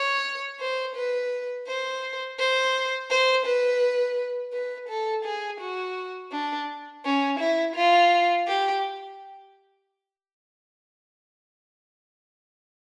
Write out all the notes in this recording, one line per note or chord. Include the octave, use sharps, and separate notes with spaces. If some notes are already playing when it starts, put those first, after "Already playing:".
Already playing: C#5
C5
B4
C5
C5
C5
B4
B4
A4
G#4
F#4
D4
C#4
E4
F4
G4